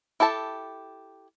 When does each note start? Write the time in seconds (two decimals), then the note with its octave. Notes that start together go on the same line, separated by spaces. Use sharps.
0.20 E4 G4 A4 A5